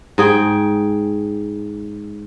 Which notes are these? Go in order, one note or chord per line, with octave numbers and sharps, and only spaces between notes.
G#2 G#4 G5